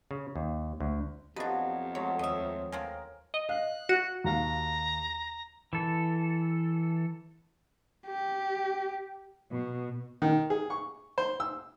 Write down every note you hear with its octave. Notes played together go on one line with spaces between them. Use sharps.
C#3
D#2
D2
F2 B2 F3 F#3 D4 G4 B4 D#5
F#3 G#3 A3 C#5
D#2 C#5 D#5 E5 D#6
F3 C4 C#4 A#4 G#5
D#5
F5 F#6
F#4
D#2 F5 A#5
E3 A4
G4
B2
D#3
G#4
C#6
C5
E6